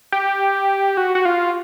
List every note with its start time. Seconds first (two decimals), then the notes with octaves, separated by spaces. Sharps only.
0.12 G4
0.97 F#4
1.15 F#4
1.25 F4